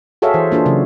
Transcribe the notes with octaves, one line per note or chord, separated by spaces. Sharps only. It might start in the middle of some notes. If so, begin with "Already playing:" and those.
F#4 G#4 A4 C#5 E5 F5
E3 C5
A#3 D4 F4 G#4
C#3 F#3